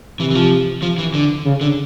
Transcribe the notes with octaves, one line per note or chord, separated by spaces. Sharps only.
C3 E3
E3
F3
F3
E3
D3
C#3
D3